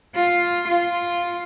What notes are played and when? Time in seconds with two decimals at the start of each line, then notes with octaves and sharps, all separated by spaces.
0.15 F4
0.68 F4